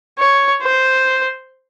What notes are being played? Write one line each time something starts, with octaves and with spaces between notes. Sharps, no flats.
C#5
C5